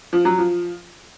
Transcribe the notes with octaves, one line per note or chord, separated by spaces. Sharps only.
F3
F#3
F3